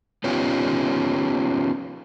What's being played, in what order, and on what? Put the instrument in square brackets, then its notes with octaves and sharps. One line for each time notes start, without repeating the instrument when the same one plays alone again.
[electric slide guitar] B3 C#4 D#4 F4 G4